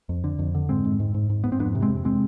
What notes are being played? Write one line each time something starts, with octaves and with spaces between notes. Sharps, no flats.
F2
D3
F2
D3
G#2 G#3 C4
G#2
G#2
G#2
G#2
G#2 B3
C4
F2 B3 D4
C3
G#3 C4
F2
C3 G#3 C4